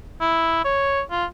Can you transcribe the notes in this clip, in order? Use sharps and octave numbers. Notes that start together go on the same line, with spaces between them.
E4
C#5
F4